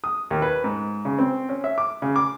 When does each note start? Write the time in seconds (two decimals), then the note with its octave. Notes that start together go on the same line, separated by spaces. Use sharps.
0.04 D#6
0.31 D#2
0.42 B4
0.64 G#2
1.05 C#3
1.19 C4
1.49 C#4
1.64 E5
1.78 D6
2.02 C#3
2.16 D6